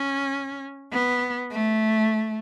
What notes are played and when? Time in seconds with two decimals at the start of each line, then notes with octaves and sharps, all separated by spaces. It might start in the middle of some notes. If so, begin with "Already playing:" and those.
Already playing: C#4
0.92 B3
1.51 A3